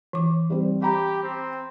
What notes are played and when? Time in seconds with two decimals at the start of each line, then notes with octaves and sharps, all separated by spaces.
0.13 E3 D6
0.50 G3 C4
0.82 G4 A#5 B5
1.23 C4